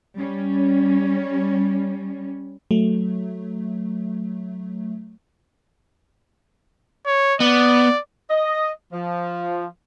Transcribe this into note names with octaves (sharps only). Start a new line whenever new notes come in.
G3 C#4
F#3 A3
C#5
B3 D5
D#5
F3